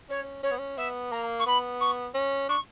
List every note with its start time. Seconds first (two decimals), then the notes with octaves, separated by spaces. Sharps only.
0.09 C#4 C#5
0.43 C#4 C#5
0.51 B3
0.59 C#4
0.77 B3 E5
1.11 A#3 A#5
1.39 C#6
1.46 B3 B5
1.80 C#6
2.14 C#4
2.49 D4 C#6